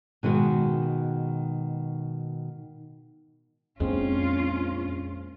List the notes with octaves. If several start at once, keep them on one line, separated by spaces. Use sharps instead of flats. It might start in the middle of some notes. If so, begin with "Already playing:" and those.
B2 D#3 G#3 F#4
A#1 F2 G#3 C4 C#4 F4